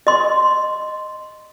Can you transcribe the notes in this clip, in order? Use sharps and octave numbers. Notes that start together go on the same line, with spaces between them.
D#5 C6